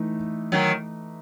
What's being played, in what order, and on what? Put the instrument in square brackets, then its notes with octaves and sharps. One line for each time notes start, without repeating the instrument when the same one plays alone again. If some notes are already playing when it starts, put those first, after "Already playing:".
Already playing: [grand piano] E3 A3 D#4
[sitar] D#3 F#3